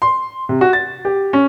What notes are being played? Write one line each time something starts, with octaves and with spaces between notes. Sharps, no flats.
C6
C3
F#4
A6
G4
C#4